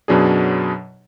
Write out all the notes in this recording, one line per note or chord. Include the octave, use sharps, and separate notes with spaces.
F#2 B2 F#3 D4 G#4